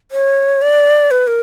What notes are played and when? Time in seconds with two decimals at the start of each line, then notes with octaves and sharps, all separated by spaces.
0.11 C#5
0.62 D5
1.11 B4
1.27 A#4